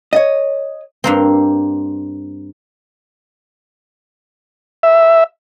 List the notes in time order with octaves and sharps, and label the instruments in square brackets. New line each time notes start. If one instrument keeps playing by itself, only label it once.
[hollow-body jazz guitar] C#5 D#5
[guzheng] G2 A#3 C4
[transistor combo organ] E5